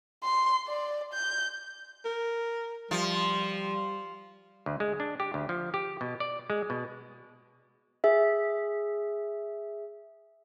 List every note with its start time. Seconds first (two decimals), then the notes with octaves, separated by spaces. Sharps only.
0.24 C6
0.68 D5
1.13 G6
2.05 A#4
2.91 F3 G3
4.66 D2
4.80 G#3
5.00 D4
5.20 G4
5.34 D2
5.49 F3
5.74 G4
6.01 B2
6.20 D5
6.50 G#3
6.70 B2
8.04 G#4 E5